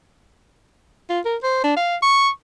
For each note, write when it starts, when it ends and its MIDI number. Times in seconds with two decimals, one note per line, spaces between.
1.10 1.20 65
1.25 1.36 70
1.43 1.64 72
1.64 1.76 62
1.76 1.96 77
2.02 2.29 85